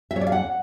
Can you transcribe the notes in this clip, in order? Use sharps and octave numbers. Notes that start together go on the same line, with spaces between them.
E5
C#5
D5
F5
F#5